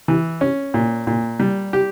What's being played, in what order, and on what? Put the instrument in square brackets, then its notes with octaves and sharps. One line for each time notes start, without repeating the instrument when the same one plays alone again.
[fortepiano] E3
C#4
A#2
A#2
G3
G4